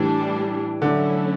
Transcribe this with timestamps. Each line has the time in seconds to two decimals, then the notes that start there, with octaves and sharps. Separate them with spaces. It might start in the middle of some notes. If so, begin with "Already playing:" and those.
Already playing: A2 E3 G3 D4
0.82 D3 F#3 A3 C#4 E4